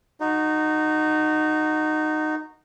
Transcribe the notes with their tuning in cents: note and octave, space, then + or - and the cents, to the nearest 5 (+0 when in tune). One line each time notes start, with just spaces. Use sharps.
D#4 -15 F#4 -10